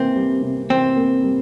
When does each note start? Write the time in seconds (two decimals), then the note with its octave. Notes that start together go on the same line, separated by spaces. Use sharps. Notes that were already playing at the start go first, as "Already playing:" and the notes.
Already playing: C3 E3 A#3 C4
0.16 G3
0.43 C3
0.70 E3 C4
0.96 A#3
1.24 G3